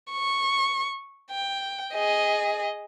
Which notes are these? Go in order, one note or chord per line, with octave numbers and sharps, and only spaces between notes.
C#6
G5
G#4 D#5